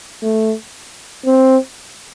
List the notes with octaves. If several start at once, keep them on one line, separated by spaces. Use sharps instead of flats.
A3
C4